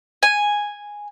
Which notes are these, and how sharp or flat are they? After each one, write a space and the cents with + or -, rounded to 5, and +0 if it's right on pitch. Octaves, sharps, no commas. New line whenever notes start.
G#5 -5